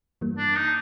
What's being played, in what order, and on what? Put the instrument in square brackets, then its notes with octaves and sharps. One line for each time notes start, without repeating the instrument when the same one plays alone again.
[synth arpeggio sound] G2 E3 G3 A#3
[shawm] D4
D#4